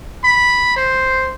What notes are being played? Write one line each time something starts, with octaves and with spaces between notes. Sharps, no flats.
B5
C5